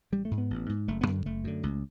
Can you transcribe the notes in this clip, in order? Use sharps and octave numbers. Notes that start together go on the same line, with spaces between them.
A1 G3
A3
G#2
B3
A1
G#2
F#1 A3
B3
F#2 D3
F#1 A3
F#2 D3
C#2